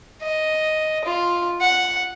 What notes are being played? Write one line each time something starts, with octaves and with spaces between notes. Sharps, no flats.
D#5
F4
F#5